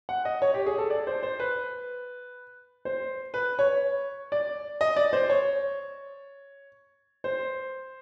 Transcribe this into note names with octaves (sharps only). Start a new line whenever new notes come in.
F#5
D#5
C#5
G4
G#4
A4
D5
C5
C5
B4
C5
B4
C#5
D5
D#5
D5
C5
C#5
C5